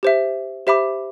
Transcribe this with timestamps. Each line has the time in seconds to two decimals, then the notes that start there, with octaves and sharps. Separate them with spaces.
0.03 G4 C5 E5
0.67 G4 C5 E5 B5 D6